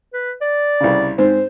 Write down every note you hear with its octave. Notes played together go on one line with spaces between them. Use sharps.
B4
D5
C2 C#3
G#2 C4 C5